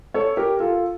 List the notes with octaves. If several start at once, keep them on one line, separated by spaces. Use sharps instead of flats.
A4 C#5
G4 A#4
F4 A4